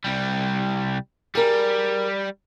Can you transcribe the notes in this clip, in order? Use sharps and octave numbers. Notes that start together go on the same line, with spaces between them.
C2 G3
G3 G#4 A#4